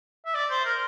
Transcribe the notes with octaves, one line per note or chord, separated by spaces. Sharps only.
E5
D5
C5
A#4